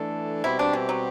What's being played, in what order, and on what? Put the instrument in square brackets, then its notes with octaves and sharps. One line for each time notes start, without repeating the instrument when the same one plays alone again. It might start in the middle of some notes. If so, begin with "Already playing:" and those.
Already playing: [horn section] E3 A3 D4 A4
[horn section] B2 G3 C4 G4 [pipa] E4
[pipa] D4
E3
F#3